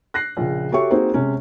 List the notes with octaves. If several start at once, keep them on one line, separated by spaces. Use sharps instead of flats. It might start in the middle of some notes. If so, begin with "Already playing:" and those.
F#6 A#6 C7
A#1 C#3
F#4 G4 A4 C#5 E5 C#6
A#3 C4 D#4 F#4 G#4 C5
C3 G#3 C#4